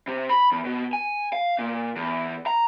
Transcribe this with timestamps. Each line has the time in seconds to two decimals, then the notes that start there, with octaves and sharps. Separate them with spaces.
0.08 C3
0.29 B5
0.52 E2
0.65 B2
0.93 G#5
1.33 F5
1.59 A#2
1.96 E2
2.47 A#5